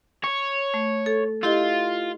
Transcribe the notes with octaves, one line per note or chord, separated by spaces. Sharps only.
C#5
A3
A4
E4 F4 G4 D#5